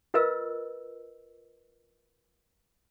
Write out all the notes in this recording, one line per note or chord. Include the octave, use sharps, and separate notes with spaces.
F4 A#4 B4 D#5 E6